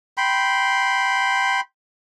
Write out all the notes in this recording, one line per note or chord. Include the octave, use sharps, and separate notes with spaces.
G5 B5 C6